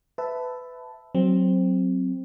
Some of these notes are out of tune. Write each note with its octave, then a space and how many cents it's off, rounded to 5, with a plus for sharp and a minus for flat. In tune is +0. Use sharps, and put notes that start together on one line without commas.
B4 +20 E5 +0 A5 +0
F#3 +5 C4 +5